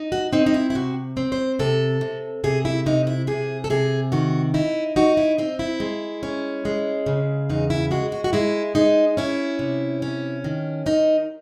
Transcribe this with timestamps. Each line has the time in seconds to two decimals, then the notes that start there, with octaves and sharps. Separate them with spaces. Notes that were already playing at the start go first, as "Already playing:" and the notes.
Already playing: D#4
0.12 F#4
0.33 C4 D#4
0.46 D#4
0.54 E4
0.70 E4
0.75 C3 F#4
1.17 C4
1.32 C5
1.59 C3 A4
2.01 C3
2.44 C3 G#4
2.65 E4
2.86 C3 D#4
3.07 E4
3.27 C3 G#4
3.64 A4
3.70 C3 G#4
4.12 D#3 F#4
4.54 D#4 E4
4.96 D#4 F#4
5.17 E4
5.38 C4 D#4
5.59 E4
5.80 G#3
6.23 C#4
6.65 G#3
7.06 C#3
7.50 E2 D#4
7.70 E4
7.91 G#3 F#4
8.12 F#4
8.24 F#4
8.33 G#3 E4
8.75 G#3 D#4
9.17 C#4 E4
9.59 C3
10.02 C#4
10.44 D#3
10.86 D#3 D#4